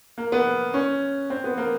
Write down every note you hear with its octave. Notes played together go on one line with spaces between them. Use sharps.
A#3
B3
C#4
C4
B3
A#3